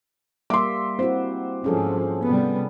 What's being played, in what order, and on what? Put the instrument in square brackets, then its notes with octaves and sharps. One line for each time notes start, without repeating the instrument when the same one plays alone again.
[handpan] G3 A#3 E5 [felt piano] C6 D6
[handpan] C4 E4 F#4 [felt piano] C5
[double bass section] G#2 F3 [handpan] C#4 G#4 A4
[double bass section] C3 G3 B3